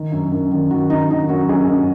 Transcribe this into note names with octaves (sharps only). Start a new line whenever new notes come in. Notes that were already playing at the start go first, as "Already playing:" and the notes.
Already playing: D#3
F#2
F#2
D#3
D#3 F#4
D#3 D#4
D#3 D#4
F#2 F#4
F#2 G#4
F#2